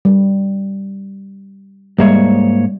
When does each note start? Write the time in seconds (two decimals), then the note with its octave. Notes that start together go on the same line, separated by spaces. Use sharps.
0.05 G3
1.99 G#2 G3 G#3 A#3 C#5 E5